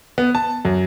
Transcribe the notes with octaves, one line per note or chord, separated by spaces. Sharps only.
B3
A5
F#2